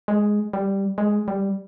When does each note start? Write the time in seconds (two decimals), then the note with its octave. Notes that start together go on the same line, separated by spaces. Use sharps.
0.08 G#3
0.53 G3
0.98 G#3
1.28 G3